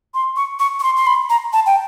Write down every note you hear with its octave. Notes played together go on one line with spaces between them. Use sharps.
C6
C#6
C#6
C#6
C6
C6
B5
A#5
A5
G5